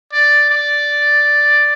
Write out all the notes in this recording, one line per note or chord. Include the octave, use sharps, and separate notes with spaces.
D5
D5